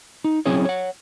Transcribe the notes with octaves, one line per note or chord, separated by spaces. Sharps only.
D#4
F#3 C4 C#4 E4 G#4 C#5
C#5 F#5